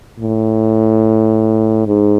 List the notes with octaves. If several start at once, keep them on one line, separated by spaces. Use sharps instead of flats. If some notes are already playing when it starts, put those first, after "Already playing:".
A2
G#2